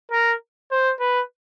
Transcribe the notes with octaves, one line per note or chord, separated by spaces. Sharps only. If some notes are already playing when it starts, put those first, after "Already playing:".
A#4
C5
B4